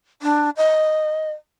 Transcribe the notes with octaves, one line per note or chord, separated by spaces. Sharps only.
D4
D#5